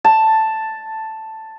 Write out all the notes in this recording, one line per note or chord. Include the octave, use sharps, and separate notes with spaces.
A5